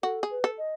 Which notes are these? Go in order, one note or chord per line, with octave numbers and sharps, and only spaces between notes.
F#4 A4
G#4
B4
A4
D#5